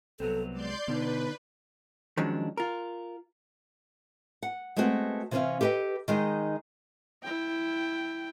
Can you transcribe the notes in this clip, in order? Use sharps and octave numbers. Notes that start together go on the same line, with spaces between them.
C2 F#3 B3 C4 A4
G#3 D5 C6 G6
B2 D3 B3 D#4 B4
D#3 F3 F#3 G#3 C#4 D4
F4 A#4
F#5
G#3 A3 B3 C4 F#4
C3 E3 A3 C4 C#4 F5
G4 A4 B4 D#5 G5
D#3 G#3 D#4
E4 G5